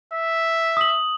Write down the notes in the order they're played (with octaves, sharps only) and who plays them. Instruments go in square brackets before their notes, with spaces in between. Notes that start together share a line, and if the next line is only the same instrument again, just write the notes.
[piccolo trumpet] E5
[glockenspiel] D#6 F#7